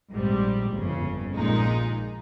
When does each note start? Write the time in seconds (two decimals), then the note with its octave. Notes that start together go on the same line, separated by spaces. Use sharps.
0.13 A#1 G#2 G3 C4
0.73 G1 F2 C#3
1.35 A#1 A#2 G#3 D#4